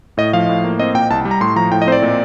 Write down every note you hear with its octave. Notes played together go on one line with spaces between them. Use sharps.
A2 D#5
F3 F5
A2
A#3
C4 D#5
A#2 G5
C2 A5
G3
A#5
A2 C6
F3 A#5
A2 G5
D#5
C4 C5
D5
A#2